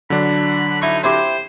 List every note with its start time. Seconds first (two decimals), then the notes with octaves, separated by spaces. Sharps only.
0.10 D3 F#3 D4 B5
0.82 D#4 E4 C#6
1.04 C4 E4 G4 C5